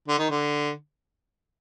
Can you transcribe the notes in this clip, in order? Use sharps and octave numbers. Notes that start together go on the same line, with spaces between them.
D3
D#3
D3